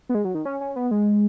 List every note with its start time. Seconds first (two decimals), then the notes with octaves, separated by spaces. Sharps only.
0.09 B3
0.15 G#3
0.25 F#3
0.35 D#3
0.45 C#4
0.61 C#4
0.76 B3
0.91 G#3